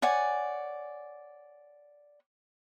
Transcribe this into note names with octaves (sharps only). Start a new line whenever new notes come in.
C#5 D5 F#5 G#5